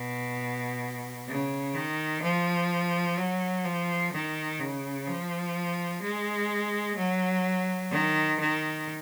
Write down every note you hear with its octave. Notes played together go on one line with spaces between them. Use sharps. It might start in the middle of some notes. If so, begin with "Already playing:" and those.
Already playing: B2
C#3
D#3
F3
F#3
F3
D#3
C#3
F3
G#3
F#3
D#3
D#3